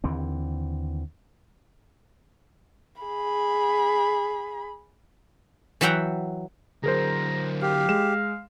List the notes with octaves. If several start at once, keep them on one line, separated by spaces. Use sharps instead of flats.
D#2 D3 E3 C4
G#4 B5
E3 F#3 E5 F#5 G5 A#5
D3 F#3 G#4 A#4 C5 A#5
G4 F5
G#3 E7